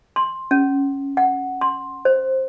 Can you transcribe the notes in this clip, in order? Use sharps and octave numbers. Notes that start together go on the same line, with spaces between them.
C6
C#4
F#5
C6
C5